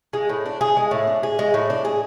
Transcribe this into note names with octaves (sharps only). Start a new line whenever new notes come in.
G#3
A2
D4
G#4
G#3
A2
D4
G#4
G#3
A2
D4
G#4